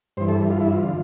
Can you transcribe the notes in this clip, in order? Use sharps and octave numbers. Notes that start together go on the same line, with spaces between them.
G2 E3 C5
A4
F4
E4
F4
D3